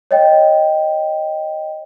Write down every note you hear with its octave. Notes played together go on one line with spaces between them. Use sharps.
C#5 D#5 G5